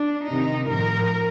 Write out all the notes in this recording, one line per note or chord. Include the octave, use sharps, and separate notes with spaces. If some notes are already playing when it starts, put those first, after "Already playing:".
Already playing: D4
C3 D#3 D#4
A2 F3 A#4